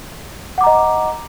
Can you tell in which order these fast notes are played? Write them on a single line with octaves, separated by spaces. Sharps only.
F#5 D6 A#5 D#5